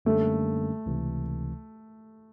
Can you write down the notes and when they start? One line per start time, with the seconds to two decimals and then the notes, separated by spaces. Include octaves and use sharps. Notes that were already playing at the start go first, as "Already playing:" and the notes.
0.05 F#2 D3 G3 A3 A#3 C#4
0.86 C#2 C3 E3